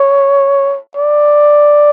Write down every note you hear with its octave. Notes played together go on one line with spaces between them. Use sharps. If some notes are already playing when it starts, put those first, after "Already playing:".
Already playing: C#5
D5